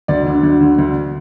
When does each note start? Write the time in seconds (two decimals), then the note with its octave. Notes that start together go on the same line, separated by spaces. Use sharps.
0.08 D2 D5
0.26 D3
0.43 D2
0.61 D3
0.78 D2